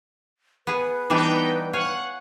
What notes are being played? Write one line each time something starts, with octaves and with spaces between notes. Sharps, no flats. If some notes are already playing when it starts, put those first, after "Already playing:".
B3 G#4 B4
E3 G3 B3 D4 D#4 G5
C#5 F5 F#5 G#5